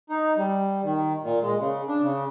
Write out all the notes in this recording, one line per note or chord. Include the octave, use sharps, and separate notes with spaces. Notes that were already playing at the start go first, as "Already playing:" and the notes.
D#4
G3
D#3
A#2
G#3
C#3
D4
C#3